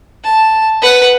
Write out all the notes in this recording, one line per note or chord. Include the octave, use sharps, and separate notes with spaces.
A5
B4 F#5